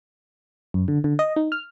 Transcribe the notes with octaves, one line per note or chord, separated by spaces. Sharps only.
F#2
D3
D3
D#5
D#4
F6